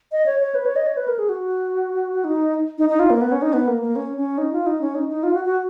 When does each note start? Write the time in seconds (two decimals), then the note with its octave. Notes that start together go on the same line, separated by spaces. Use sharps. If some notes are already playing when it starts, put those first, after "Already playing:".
0.12 D#5
0.26 C#5
0.40 C#5
0.55 B4
0.66 C#5
0.76 D#5
0.87 C#5
0.97 B4
1.08 A#4
1.19 G#4
1.29 F#4
2.24 D#4
2.78 D#4
2.89 D#4
2.99 F4
3.10 A#3
3.21 B3
3.32 C#4
3.42 D#4
3.53 B3
3.67 A#3
3.82 A#3
3.96 C#4
4.17 C#4
4.38 D#4
4.53 F4
4.66 D#4
4.81 C#4
4.95 D#4
5.09 D#4
5.23 F4
5.34 F#4
5.45 F#4